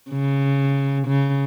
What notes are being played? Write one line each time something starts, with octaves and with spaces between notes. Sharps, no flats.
C#3
C#3